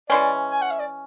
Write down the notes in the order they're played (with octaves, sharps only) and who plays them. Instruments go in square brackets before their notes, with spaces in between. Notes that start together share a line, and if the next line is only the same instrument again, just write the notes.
[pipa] E3 G#3 C#4 [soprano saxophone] D5
[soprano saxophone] G#5
F#5
E5
D5